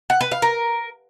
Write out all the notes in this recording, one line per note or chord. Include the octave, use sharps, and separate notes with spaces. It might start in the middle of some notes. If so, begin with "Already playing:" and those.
F#5
B4
F5
A#4